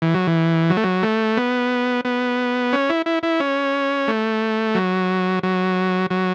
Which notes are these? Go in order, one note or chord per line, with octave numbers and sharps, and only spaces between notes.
E3
F#3
E3
F#3
A3
F#3
A3
B3
B3
C#4
E4
E4
E4
C#4
A3
F#3
F#3
F#3